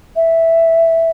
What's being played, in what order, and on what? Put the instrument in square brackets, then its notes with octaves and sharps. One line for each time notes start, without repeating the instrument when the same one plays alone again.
[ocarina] E5